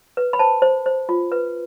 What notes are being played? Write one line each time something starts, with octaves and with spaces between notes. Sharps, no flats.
B4
B5
C5 A5
C5
C5
F4
B4